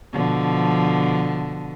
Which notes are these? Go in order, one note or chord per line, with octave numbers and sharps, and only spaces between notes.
B2 D3 F3